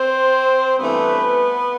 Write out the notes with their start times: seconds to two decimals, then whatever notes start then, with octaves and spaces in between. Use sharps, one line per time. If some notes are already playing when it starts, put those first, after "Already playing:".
Already playing: C4 C5
0.79 G2 E3 A3 B3 C4 B4